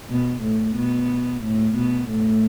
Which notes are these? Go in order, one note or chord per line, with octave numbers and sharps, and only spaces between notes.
B2 B3
A2 A3
B2 B3
A2 A3
B2 B3
A2 A3